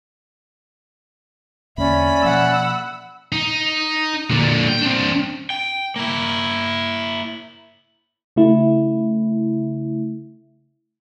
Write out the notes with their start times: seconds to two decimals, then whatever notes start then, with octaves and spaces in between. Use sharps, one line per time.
1.78 E2 D3 A#3 C#4 D5 E5 B5
2.22 B2 F3 A#3 F#5 E6
3.32 D#4
4.30 A#2 D3
4.69 G5
4.82 C4 D4
5.50 G5
5.96 A#3 E4
8.36 C#3 A3 E4